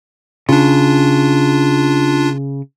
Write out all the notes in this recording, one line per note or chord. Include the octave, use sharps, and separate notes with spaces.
C#3 D4 F4